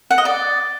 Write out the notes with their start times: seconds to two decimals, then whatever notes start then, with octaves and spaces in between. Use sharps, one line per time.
0.10 F#5
0.18 D#5
0.25 D5